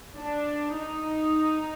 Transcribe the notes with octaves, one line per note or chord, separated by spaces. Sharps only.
D4
D#4